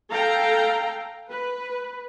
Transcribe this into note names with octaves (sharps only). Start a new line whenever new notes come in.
A4 F5 G5 A#5
B4